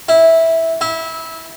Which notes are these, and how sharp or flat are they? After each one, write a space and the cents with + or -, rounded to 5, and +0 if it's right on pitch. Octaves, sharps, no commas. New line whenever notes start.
E4 -10
E4 -20